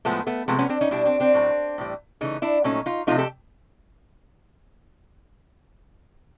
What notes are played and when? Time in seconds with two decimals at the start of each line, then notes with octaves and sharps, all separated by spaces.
0.05 A2 F3 G#3 A3 B3
0.27 A3 B3
0.48 C3 F3 G#3 A3 B3
0.59 B3 C#4
0.69 C4 D4
0.81 C#4 D#4
0.91 B2 G3 D4 E4
1.05 C4 D4
1.20 C4 D4
1.34 A2 F#3 A3
1.78 A2 E3 G3
2.21 C#3 E3 A3 C#4 D#4
2.42 D4 E4
2.64 A#2 F#3 A3 C#4 D#4
2.86 D#4 F4
3.07 C3 F3 A3 D#4 F4
3.18 G4 A4